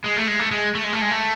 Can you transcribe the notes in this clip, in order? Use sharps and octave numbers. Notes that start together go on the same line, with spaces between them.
G#3
A3
G#3
A3
G#3
A3
G#3
A3
G#3
A3